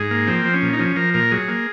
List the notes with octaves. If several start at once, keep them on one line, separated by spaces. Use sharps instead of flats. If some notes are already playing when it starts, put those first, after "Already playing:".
Already playing: G#2 G#4
A#3
F3 C4
F3
C#4
A#2
D#4
F3 C#4
F3 A#4
A#2 A#4
F#3 G#4
A#3